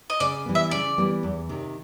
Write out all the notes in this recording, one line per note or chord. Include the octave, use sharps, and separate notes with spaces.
D#5
C#3 D5
E3 G3 B3
E5
C#3 D5
E3 G3 B3
E2
C3 D#3